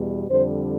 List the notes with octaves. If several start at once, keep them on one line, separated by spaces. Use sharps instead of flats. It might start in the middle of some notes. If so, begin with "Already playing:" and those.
Already playing: E2 B2 G3
F2 D3 G3 C5